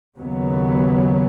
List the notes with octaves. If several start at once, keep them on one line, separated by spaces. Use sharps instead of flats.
D#2 C#3 F#3 B3